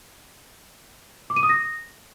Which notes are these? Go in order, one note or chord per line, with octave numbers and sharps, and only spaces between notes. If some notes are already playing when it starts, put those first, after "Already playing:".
D6
D#7
D#6
A#6